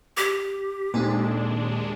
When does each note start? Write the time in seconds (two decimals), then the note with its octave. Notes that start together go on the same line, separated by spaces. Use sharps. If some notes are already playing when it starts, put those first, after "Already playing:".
0.17 G4
0.94 D#2 A#2 G#3 C4 D4 D#4 A4